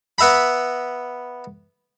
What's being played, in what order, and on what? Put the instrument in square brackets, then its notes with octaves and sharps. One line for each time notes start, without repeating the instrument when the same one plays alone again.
[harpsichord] B3 E5 A#5 B5